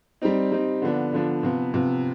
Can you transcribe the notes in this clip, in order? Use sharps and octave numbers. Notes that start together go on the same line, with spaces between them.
G3 C4 D#4
G3 C4 D#4
D3 F3 B3 D4
D3 F3 B3 D4
C3 F3 B3
C3 F3 B3